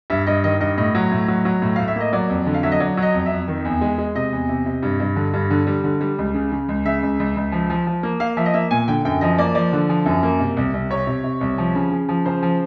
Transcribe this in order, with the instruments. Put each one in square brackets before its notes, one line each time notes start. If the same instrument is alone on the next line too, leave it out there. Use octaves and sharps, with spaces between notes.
[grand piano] G2 E5
G2 D#5
D#3 D#5
G2 D#5
A2 D#5
F#3
A2
F#3
F#3
A2
A2 F5
E5
A#3 D#5
F#3 D5
F2
D3
F5
F#3 E5
D#5
F#3 D5
F#3
D#5
F2
E5
F2
D#3
E2
G#3
G#3
C3 D#5
E2
C3
C3
G2
G2
D3
G2
D3
G3
D3
G3
C#2
C#3
C#3
C#2
C#3 E5
C#2
C#2
C#2
F3
F3
F3
A#3
A#3 F5
F3 E5
D#5
A#3 E5
A#2 G#5
D3 G5
F#2 G5
F3 D#5
A#3 D5
F3 D5
D3
F3
F#2
A#3
C3
C2
C2
C3 C#5
C3
C3
C2
F3
C#3
C#3
F3
C#3 C5
F3